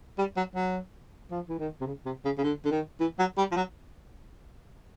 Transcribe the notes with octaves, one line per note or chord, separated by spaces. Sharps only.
G3
F#3
F#3
F3
E3
D#3
C3
C#3
C3
C#3
C#3
D3
D3
D#3
E3
F#3
G3
F3
F#3